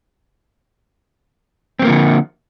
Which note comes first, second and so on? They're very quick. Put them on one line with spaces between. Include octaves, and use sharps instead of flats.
C4 F#3 A#3 F3 D3